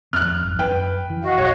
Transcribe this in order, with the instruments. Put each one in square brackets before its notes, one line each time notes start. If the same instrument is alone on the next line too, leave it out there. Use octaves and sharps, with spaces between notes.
[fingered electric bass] D#1 F2 C4 [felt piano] F6 F#6
[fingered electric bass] G#1 F2
[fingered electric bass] F#2 [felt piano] B4 G5
[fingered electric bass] E3
[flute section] F#4 D#5 F5
[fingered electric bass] E1 B1 [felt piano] C#5